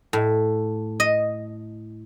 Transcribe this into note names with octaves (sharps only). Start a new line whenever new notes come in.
A2
D#5